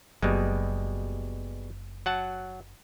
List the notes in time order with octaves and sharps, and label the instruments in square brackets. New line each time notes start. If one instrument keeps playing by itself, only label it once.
[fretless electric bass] F#1 [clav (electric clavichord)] B2 G3 G#3
[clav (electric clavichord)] F#3 F#5 A5